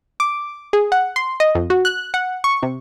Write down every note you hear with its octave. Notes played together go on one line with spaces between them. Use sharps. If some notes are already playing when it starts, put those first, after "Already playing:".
D6
G#4
F#5
C6
D#5
F2
F#4
F#6
F#5
C#6
C3